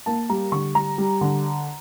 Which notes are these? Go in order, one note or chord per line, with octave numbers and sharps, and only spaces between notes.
A#3 A5
G3 A#5
D3 C#6
G3 A#5
G3
D3